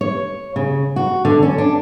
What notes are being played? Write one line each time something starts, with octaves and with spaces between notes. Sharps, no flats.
C#5
C#3
F#4
D3
C#4
D4